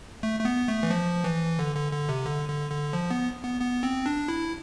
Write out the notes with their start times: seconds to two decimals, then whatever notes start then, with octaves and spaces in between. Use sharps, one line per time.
0.23 A3
0.40 A3
0.45 B3
0.68 A3
0.83 E3
0.91 F3
1.24 E3
1.59 D3
1.76 D3
1.92 D3
2.09 C3
2.26 D3
2.49 D3
2.71 D3
2.93 F3
3.10 B3
3.44 B3
3.61 B3
3.83 C4
4.06 D4
4.28 E4